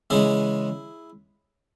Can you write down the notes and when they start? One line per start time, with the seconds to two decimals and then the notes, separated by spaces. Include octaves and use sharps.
0.10 C#3 E3 G#3 E4 G#4